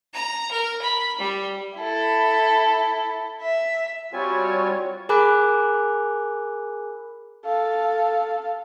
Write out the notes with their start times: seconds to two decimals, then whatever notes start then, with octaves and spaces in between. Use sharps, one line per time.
0.13 A#5
0.51 A#4
0.82 B5
1.18 G3
1.77 E4 A4
3.42 E5
4.13 G3 C4 F4 F#4 C#5 G#5
5.09 G#4 A#4 G#5 B5 D6 F#6
7.45 A4 F5